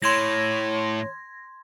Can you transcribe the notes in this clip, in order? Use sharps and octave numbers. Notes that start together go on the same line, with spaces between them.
A2 C#5 C6 G#6 A#6